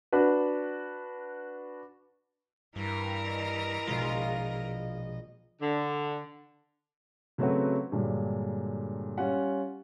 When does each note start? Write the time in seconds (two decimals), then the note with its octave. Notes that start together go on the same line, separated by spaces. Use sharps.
0.12 D4 F#4 B4
2.76 G2 E3 A#4 A#5
3.30 D#5
3.87 A#1 B2 G#3 F4
5.61 D3
7.38 C#3 F#3 A3 C4 F#4 B4
7.92 G2 A#2 D3 F#3 G#3 D4
9.18 G3 C#4 F4 F#5